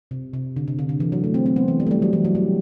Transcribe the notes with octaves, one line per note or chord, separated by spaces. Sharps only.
C3
C3
D3
C3
D3
D3
E3
F#3
A3
C4
C4
B3
E3
G3
A3
G3
F#3
E3
F#3
G3